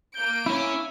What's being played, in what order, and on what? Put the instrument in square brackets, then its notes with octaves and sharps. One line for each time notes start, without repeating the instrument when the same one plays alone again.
[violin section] A#3 D7 [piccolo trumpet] G6
[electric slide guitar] C#4 C#5 [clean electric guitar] E4 [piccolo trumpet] E5